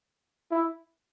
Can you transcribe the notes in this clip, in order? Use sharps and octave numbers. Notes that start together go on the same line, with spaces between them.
E4